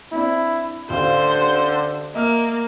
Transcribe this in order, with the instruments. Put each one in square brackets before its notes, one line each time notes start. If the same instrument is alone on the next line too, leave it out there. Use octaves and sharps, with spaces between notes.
[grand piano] C4 D4 [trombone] E4
[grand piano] A1 D2 F5 [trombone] D3 [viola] C5
[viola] A#3 [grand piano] D#5 E5 F6